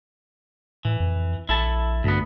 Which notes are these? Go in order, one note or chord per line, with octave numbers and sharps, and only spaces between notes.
A2 E3
F2
A#1 E4 A4 A5
D2 G2 B3